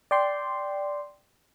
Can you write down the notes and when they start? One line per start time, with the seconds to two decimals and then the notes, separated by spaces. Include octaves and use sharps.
0.11 D5 G5 C6